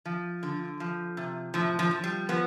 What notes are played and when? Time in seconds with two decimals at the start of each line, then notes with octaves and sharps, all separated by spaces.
0.05 F3
0.43 D3
0.80 F3
1.17 C3
1.54 A2 F3
1.79 F3
1.91 F3
2.04 G3
2.29 F3 B3